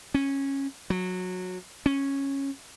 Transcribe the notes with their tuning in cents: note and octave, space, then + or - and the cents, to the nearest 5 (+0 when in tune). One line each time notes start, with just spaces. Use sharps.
C#4 -15
F#3 -15
C#4 -10